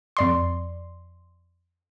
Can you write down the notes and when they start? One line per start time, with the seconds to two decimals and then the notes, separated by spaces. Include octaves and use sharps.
0.17 F2 D5 C6